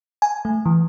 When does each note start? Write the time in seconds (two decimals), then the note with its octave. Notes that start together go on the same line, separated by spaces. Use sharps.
0.22 G#5
0.45 A3
0.66 E3